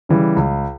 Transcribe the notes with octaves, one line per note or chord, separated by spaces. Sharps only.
C#3 E3 G3
C#2